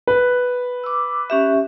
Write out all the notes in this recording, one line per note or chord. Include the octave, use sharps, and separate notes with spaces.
B4
D6 E6
C#4 G4 E5